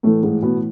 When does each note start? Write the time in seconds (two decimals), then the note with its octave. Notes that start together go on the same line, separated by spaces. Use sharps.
0.03 A2 E3 A3
0.23 G#2 G#3
0.43 B2 B3